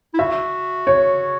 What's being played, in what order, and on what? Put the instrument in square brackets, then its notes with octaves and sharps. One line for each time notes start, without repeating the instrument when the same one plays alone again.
[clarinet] E4
[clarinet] F#4 [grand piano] E5
[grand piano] C#5